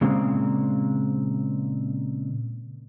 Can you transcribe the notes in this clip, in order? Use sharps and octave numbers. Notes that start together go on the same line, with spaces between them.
A#2 C#3 G#3 A#3 C4